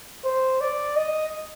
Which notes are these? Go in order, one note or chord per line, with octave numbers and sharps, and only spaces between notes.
C5
D5
D#5